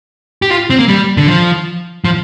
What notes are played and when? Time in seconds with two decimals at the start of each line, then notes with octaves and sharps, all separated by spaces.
0.42 G4
0.50 F4
0.70 C4
0.79 A#3
0.88 G3
1.17 D3
1.27 F3
2.05 F3